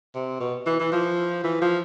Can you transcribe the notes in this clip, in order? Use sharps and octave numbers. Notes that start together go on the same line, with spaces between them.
C3
B2
E3
E3
F3
E3
F3